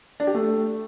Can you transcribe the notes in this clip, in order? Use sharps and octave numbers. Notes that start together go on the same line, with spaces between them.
D4
G4
A3